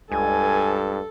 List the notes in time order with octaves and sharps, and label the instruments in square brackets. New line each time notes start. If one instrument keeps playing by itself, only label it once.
[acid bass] C#2 [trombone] G2 [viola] A4 [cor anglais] G#5